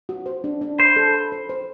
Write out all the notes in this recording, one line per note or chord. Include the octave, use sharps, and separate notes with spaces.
F#4
C5
D4
D4
C5 B5
A4
B5
C5
C5